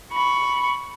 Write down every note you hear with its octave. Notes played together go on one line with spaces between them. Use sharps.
B5 C#6